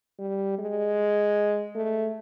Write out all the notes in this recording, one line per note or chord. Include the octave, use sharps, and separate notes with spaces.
G3
G#3
A3